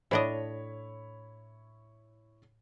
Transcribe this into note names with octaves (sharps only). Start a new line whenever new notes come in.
A2 D4 E4 C#5 D#5 B5